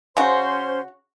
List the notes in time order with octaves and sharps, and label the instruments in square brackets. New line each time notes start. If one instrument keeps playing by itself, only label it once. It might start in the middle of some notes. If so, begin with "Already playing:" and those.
[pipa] C#3 F#4 [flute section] C#4 C5 C6